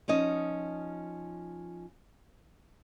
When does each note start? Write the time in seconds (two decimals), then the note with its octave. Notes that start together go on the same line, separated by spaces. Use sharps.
0.08 F3 C#4 D#4 D#5